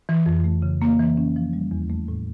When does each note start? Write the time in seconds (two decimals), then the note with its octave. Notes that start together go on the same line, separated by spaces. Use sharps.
0.09 E3
0.26 F2
0.44 A3
0.62 C#3
0.82 A#3
0.99 E3
1.17 C#4
1.36 F3
1.53 G3
1.71 E2
1.90 A3
2.08 A2